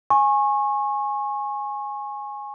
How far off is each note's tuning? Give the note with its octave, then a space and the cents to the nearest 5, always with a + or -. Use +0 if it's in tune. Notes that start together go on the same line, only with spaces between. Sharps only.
G#5 +0 C#6 -30